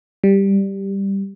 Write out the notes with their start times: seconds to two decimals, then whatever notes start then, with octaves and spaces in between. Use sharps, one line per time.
0.24 G3